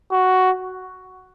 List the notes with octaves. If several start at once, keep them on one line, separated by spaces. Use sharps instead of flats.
F#4